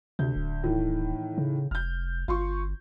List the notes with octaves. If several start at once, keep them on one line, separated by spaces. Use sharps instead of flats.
D2 C3 G6
D1
A2 D#3 E3
C#3
F1 F6 G6
G1 F4 C6 C#6